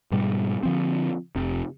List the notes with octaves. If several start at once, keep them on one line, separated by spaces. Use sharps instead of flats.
G#2 B2 G3
D3 F3 C4
F1 C3